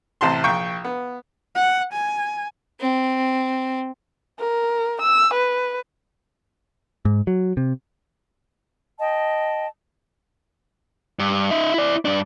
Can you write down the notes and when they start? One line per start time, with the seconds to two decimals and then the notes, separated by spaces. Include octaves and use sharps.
0.21 A1 C3 A5 C6
0.44 A#1 G5 C#6
0.84 B3
1.55 F#5
1.93 G#5
2.81 C4
4.39 A#4
5.01 E6
5.34 B4
7.05 G#2
7.27 F#3
7.57 C3
8.98 D#5 G5 A5
11.19 G2
11.51 D#4 E5
11.74 E4 D5
12.05 G2 D4